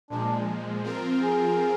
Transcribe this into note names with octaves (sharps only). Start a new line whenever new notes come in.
A#2 F3 G#3 D4
F3 C4 F4 A#4
G#4